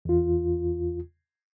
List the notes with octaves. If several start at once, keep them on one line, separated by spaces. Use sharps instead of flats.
E2 F4